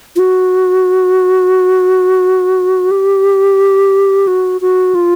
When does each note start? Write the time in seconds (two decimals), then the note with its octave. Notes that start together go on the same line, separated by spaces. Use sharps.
0.16 F4
0.19 F#4
2.91 G4
4.27 F#4
4.61 F#4
4.95 F4